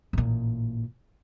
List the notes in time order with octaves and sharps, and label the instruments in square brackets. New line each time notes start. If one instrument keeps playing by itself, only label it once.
[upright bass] A1 A#2